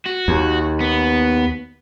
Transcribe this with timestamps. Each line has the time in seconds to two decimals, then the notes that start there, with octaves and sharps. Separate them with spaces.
0.06 F#4
0.28 D#2
0.80 B3